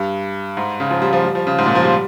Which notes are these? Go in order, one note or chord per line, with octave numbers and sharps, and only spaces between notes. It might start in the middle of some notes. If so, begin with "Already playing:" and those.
Already playing: G2
G#2
C#3
F3
G3
F3
G3
F3
C#3
G#2
A#2
F3
G3